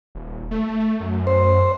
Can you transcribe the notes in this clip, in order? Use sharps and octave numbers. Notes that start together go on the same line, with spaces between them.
D#1
A3
F#2
C5